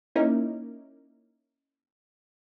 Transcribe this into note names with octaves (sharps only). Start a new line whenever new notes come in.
A#3 C#4 D#4 E4 A#4